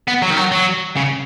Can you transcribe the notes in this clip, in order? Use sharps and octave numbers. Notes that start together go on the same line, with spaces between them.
B3
F#3
D#3
F#3
F#3
C#3